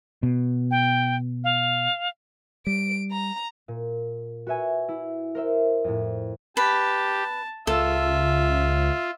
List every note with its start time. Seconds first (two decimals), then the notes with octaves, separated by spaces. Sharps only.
0.23 B2
0.71 G5
1.44 F5
2.67 G3 D7
3.12 A#5
3.68 A#2
4.47 F#4 B4 E5 G#5
4.89 E4
5.35 A#4 C5 E5
5.84 F2 A2
6.57 G4 B4 A5
7.67 C#2 F4 A4 E5